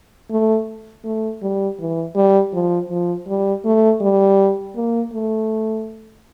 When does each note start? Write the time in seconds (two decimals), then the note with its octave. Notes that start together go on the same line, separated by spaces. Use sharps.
0.31 A3
1.04 A3
1.42 G3
1.79 E3
2.15 G3
2.53 F3
2.90 F3
3.28 G3
3.65 A3
4.01 G3
4.76 A#3
5.13 A3